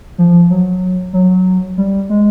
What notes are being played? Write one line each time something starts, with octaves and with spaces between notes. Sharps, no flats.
F3
F#3
F#3
G3
G#3